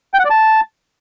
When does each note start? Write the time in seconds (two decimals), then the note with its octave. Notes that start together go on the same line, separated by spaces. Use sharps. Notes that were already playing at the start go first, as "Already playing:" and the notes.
0.14 G5
0.19 F#5
0.25 D5
0.30 A5